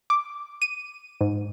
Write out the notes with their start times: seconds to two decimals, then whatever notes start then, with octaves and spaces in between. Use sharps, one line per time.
0.10 D6
0.62 D#7
1.21 G#2